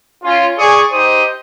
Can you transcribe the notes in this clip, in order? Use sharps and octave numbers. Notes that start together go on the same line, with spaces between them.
C#4 F4
G#4 D5 G#5 C#6
D#4 G4 C5 D#6